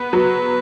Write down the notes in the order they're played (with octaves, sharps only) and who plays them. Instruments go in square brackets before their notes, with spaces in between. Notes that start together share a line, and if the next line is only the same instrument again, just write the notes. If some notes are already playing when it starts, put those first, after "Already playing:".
Already playing: [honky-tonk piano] B3 [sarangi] B4
[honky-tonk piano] F#3